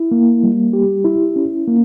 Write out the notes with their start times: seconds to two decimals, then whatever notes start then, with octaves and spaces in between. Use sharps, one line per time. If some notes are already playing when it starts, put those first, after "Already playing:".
Already playing: E4
0.12 A#3
0.43 G3
0.73 G4
1.04 E4
1.36 C#4
1.68 A#3